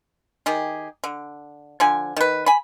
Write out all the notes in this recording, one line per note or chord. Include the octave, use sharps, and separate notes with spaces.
D#3 G4 G#4
D3
D3 F3 G#5
D#3 B4
G#5 B5